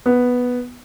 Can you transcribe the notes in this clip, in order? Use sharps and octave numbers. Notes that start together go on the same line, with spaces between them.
B3